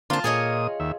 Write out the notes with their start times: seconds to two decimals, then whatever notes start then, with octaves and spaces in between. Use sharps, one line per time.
0.10 D3 A#3 C4 F4 A5
0.24 A#2 G#4 C#5 D#5 D#6
0.80 D#2 E5